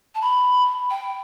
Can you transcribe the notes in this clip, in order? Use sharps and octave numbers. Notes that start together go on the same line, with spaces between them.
A5
B5
G5